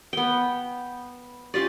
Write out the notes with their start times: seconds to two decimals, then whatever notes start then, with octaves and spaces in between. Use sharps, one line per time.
0.13 B3 G5
1.54 C#4 F4 G4 D5